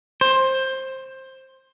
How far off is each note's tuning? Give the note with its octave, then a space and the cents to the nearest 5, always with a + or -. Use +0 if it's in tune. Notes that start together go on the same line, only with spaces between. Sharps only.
C5 +15